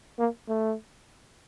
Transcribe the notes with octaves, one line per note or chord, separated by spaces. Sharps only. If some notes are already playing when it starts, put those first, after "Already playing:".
A#3
A3